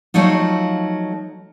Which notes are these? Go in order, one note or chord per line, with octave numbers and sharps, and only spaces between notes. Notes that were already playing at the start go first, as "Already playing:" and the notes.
F3 F#3 A3 D#4 F4